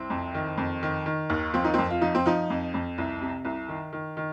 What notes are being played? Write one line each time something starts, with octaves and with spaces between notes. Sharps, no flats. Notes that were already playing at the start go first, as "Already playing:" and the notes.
Already playing: C2 C4
F2
D#3
F2
D#3
D#3
D#2
F3 C4
D#4
F2 C4
F4
F3 D#4
C4
F3 D#4
F2
F2
C2
C3
C2
D#3
D#3
D#3